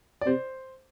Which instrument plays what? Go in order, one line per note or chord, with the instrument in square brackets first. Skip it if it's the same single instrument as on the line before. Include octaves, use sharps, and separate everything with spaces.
[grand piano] D5
[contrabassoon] C3 [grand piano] C5